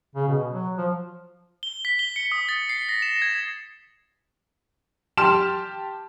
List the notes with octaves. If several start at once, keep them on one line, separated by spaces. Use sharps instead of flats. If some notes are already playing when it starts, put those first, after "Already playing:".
C#3
B2
F#3
F3
G7
B6
G7
C#7
D#6
A6
C7
A#6
E7
G#6
G4 A5 C6 F6 E7